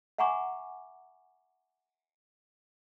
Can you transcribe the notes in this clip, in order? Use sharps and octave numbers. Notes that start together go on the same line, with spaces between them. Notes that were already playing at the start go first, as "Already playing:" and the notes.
E5 F#5 G#5 A#5 C#6 D6